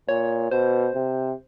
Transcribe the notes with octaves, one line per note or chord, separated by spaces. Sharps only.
A#2 C#5
B2 C5
C3